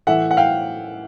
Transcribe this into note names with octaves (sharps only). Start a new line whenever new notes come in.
A2 E3 A3 E5 F#5
F#5
F5 G5